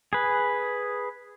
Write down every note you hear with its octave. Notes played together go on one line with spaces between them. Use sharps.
G#4 B4